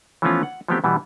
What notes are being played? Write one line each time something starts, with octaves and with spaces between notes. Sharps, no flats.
E3 F3 A3 B3 C#4 F4
F#5
F3 F#3 A3 B3 C4 G4
B2 E3 G3 B3